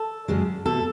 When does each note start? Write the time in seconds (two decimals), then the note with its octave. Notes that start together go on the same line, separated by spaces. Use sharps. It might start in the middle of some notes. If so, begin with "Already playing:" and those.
Already playing: A4
0.28 F#2 C#3 G#3
0.66 B2 A3 A4